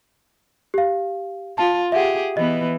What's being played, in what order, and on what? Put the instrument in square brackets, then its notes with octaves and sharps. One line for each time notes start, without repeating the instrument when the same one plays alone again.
[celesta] G4 F5
[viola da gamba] F4 [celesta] A5
[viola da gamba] G4 G#4 [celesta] E5 F#5
[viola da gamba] E3 B3 [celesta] D#5